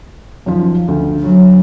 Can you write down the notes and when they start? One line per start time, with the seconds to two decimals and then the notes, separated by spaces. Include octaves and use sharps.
0.46 F#2 D#3 F3
0.88 D2
1.21 F#3